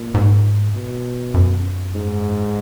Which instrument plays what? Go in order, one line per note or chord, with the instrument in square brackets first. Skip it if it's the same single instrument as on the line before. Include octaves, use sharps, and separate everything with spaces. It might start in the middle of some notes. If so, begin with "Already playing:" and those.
Already playing: [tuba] A#2
[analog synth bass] G#2
[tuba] B2
[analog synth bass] F#2
[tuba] G#2